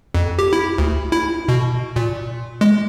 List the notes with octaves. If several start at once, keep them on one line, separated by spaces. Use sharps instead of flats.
F2
G4
E4
D2
E4
B2
A#2
G#3